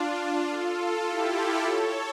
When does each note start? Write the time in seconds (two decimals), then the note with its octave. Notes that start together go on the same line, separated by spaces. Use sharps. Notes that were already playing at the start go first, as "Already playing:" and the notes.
Already playing: D4 F4
0.50 F4 A4
1.07 E4 G4
1.36 F4 A4
1.64 A4 C#5